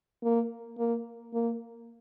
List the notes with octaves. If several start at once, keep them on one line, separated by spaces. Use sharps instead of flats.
A#3
A#3
A#3